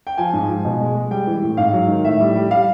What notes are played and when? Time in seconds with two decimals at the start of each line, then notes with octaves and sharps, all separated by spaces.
0.07 G5
0.17 F3 G#5
0.33 G#2
0.48 F3
0.65 B2
0.81 G#3
0.95 G#3
1.11 G3 G5
1.27 E3
1.42 A2
1.57 G#2 F5
1.73 F#3
1.88 D#3
2.04 A2 E5
2.20 G3
2.35 G3
2.51 G3 F5